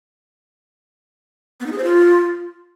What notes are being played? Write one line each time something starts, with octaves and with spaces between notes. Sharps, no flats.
B3
D#4
G#4
C5
F4